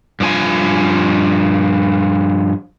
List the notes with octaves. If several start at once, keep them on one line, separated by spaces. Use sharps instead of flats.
G2 F3 G#5